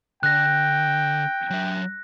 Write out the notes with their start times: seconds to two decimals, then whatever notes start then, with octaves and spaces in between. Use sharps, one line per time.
0.23 D3 G5 F#6 A#6
1.50 F#3 E5